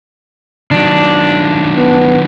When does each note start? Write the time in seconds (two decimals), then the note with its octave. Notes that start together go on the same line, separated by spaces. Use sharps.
0.71 D#3 F#3 D4
1.77 B3